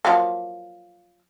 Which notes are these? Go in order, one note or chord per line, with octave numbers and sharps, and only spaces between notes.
F3 F#3 A#3